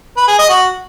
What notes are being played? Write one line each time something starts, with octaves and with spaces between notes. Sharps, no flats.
B4
G#4
D#5
F#4